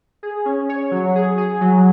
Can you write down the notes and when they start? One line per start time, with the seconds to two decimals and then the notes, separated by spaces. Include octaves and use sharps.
0.23 G#4
0.45 C#4
0.69 C#5
0.91 F#3
1.15 G#4
1.38 G#4
1.61 F#3